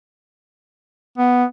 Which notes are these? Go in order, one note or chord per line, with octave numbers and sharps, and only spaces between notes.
B3